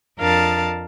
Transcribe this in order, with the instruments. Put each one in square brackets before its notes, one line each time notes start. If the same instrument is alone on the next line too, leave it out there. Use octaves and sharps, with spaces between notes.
[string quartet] F2 D4 A#4 F5 A5 A6